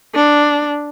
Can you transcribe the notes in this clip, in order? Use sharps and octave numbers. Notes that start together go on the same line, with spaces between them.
D4